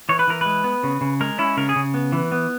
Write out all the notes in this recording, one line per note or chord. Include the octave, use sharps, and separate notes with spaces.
E3 C#5
B4
E3 A#4
G#3 B4
B3
C#3
C#3
G#3 A#4
C#4 E4
C#3 A#4
G#4
C#3
B3
E3
B3